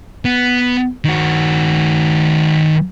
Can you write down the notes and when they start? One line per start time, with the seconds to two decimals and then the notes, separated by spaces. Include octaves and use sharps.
0.25 B3
1.05 D#3 F#4